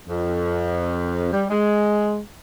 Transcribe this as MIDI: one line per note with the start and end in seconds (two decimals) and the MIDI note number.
0.08 1.30 41
1.32 1.45 55
1.49 2.19 56